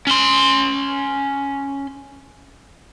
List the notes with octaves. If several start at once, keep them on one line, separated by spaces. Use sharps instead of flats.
C#4 C6